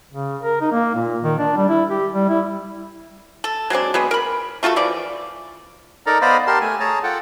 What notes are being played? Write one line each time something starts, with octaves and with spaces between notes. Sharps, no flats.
C#3
A#4
D#4
A#3
A#2
D#3
D4
G3
E4
G4
G3
E4
A4
F#3 G#3 C4 D4
F#3 G#3 B3
A#4 B5
A3 F4 F#4 A4
E3 F3 D5
D#4 A4 A#4 D5 A#5
B3 C5 D5 D#5 F5 B5
G4 A#4 A5 C6
A3 G#5
G#4 C#5 A5 A#5
F4 A4 F#5 G5